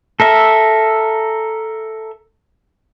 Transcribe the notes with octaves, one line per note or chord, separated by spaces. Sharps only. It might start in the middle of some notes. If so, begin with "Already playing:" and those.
A4 A#4 E5